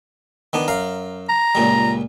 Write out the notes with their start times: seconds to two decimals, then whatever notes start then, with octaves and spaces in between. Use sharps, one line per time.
0.53 D#3 B3 D4
0.68 F#2 F5 A#5
1.29 A#5
1.55 C#2 A#2 G3